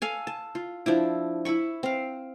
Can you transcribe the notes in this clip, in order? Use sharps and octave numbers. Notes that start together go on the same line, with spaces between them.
A4 F5 G#5
A5
F4
F3 D4 E4
E4 E5 B5 C#6
C4 F5